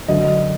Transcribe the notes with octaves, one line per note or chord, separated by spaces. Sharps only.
F#2 D3 D#5